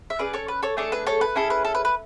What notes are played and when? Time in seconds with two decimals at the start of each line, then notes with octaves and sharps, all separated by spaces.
0.10 E5
0.19 C#4 G#4 B4 D5
0.33 A4 C#5
0.48 B4
0.63 A4 C#5
0.77 A3 D4 G#4 A4 C#5
0.92 B4
1.07 A4 C#5
1.21 B4
1.35 C#4 E4 G#4 A4
1.50 B4
1.65 A4
1.75 B4
1.85 B4